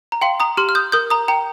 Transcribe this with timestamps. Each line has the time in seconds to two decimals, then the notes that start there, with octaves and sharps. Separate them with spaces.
0.12 A#5
0.22 F5 G5 C6
0.40 A#5 D#6
0.57 G4 C6 F6
0.69 F6
0.75 D#6 G6
0.92 A#4 D#6 G6
1.10 A#5 D#6
1.28 G5 A#5